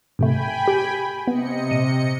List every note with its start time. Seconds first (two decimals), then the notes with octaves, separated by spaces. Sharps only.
0.19 G#2 C3 A3 G5 G#5 B5
0.68 G4
1.28 C3 B3 D#5 C#7
1.71 A#2 D#7